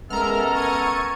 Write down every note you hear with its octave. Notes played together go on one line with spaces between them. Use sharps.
G#3 B3 C#4 A4 A#4 E5 A#5 F6
C#6 G#6 C#7 D#7